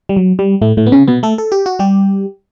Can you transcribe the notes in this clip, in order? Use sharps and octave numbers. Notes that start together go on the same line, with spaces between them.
G3
F#3
G3
A2 A3
A2 A3
B3
C#3 C#4
B2 B3
A3 A4
A4
G4
F#4
G3 G4